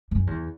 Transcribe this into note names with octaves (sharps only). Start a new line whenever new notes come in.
F#2
E2